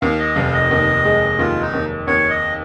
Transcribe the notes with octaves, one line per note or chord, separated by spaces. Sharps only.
D#2 F5
D#5
F1 F5
D#5
D#2
G#3
D#2 F4
D#4
D#2
D#2 C#5
D#5